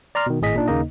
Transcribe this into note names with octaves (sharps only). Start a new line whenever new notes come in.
D5 A#5 C6 F6
B2 D#3
G#1 A2 G#4 D#5 B6
A#2 D4 D#4
D#2 C#3 A#3 D#4 D#5